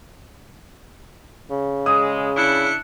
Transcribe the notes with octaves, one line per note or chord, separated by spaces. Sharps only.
C#3
G#3 D#6
D4 E4 F#6 C#7